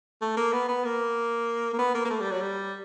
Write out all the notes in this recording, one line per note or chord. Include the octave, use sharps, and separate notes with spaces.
A3
A#3
B3
B3
A#3
A#3
B3
A#3
A#3
A3
G3
F#3
G3